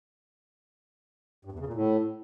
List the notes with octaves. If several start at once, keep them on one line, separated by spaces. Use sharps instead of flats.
G2
E2
C#3
A#2
A2